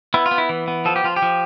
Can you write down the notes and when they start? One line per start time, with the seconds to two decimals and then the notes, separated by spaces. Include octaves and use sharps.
0.14 B3 E4
0.26 F4
0.31 B3
0.38 E4
0.49 E3
0.68 B3
0.85 F3 A4
0.96 G4
1.04 F3 F4
1.16 G4
1.22 F3